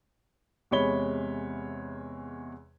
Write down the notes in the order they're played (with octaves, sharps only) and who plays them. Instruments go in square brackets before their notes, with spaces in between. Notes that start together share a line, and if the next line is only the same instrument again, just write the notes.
[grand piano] E2 C3 G#3 C#5 B5 G7